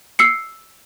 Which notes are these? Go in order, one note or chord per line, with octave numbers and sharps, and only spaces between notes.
E6 C7 C#7